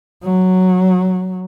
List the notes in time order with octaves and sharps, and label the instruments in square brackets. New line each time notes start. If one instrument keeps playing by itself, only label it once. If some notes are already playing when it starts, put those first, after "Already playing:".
[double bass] F#3